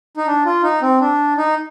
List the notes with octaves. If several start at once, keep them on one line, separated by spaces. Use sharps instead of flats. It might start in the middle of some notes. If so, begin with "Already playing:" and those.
D#4
D4
F4
D#4
C4
D4
D#4